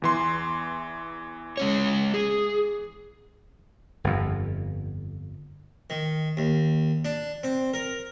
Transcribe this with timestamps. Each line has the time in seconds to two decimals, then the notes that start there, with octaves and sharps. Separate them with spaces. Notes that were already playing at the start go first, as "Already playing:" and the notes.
0.02 E2 E3 C6
1.57 G#3 C#4 C#5
2.14 G#4
4.04 G1 F2
5.90 D#3
6.37 D#2
7.05 D4
7.43 C4
7.74 A#4